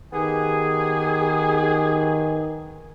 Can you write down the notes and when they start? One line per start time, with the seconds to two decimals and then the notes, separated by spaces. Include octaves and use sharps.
0.13 D#3 B3 G4 G#4 G#5